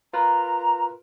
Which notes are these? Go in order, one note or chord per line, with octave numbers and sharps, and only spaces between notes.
F4 A#4 B4 A#5